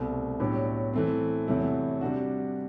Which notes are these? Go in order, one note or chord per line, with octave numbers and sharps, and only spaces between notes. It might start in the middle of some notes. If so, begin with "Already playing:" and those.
Already playing: C2 B2 A3 C4
A2 F#3 B3 D4 G4
E3 A3 C4
E2 C3 F#3 A3 E4
C3 G3 D4 F#4